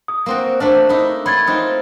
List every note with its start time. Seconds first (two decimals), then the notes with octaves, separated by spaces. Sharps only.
0.08 D#6
0.26 A#3 C4 F#4
0.60 A3 A#3 D4 C5
0.89 D#4 E4
1.26 C#5 F#5 B5 C6 G#6 A6
1.47 C4 D#4 F4